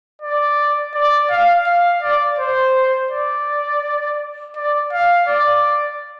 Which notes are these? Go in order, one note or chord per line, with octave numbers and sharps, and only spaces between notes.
D5
D5
F5
F5
D5
C5
D5
D5
F5
D5